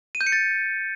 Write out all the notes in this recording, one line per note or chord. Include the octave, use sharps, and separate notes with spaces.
D#7
G6
C#7
A6